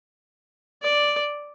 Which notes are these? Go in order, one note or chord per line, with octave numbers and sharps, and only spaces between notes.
D5